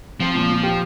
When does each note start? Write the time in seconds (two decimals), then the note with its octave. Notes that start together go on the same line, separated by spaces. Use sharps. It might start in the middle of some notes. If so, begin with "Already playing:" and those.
0.20 F3 C4
0.35 A#2
0.50 A#2
0.63 G4